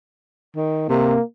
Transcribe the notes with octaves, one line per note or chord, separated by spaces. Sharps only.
D#3
C3 A#3